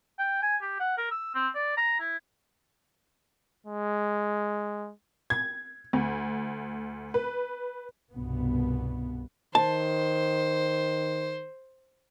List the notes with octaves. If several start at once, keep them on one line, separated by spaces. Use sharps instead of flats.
G5
G#5
G4
F#5
A#4
E6
C4
D5
A#5
E4
G#3
G#6
D2
B4
C2 G2 B2 B3
D#3 C5 A5